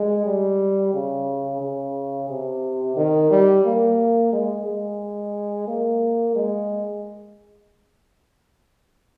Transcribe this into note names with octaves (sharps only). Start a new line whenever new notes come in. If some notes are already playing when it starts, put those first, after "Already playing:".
Already playing: G#3
G3
C#3
C#3
C3
D#3
G3
A#3
G#3
G#3
A#3
G#3